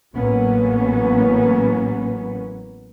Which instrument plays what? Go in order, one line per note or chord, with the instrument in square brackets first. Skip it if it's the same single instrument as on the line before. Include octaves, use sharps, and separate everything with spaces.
[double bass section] A1 F#3 A#3 B3 C#4